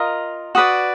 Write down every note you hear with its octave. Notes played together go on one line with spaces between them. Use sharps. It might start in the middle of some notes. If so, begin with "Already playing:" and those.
Already playing: F4 A#4 D#5
F#4 B4 D5 D#6